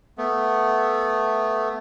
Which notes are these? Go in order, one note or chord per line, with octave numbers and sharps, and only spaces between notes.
A3 B3